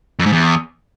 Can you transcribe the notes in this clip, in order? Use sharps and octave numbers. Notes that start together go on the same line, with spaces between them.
F2
G#2
E2